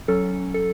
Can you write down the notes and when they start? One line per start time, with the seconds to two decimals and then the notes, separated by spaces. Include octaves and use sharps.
0.08 F#3 C#4 A4
0.54 A4